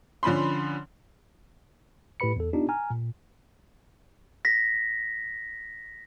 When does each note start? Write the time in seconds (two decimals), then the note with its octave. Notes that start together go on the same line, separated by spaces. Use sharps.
0.23 D3 F3 C#4 B5 C6
2.20 A2 G4 B4 B5 C#7
2.36 E2 A4
2.53 B3 D4 D#4 F4 G4
2.69 G#5 A#5 F6
2.90 A#2
4.45 A#6 B6